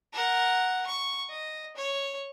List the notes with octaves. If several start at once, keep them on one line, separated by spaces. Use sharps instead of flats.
A#4 F#5
C#6
D#5
C#5